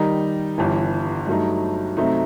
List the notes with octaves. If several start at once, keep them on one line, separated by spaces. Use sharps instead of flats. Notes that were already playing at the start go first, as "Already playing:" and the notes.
Already playing: D#3 G3 D#4
G1 G2 E3
G2 F#3 A3 D#4
C3 F#3 A3 D#4